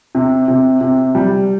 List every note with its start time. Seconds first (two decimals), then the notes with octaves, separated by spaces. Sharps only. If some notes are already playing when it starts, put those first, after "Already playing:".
0.15 C3
0.48 C3
0.81 C3
1.15 G3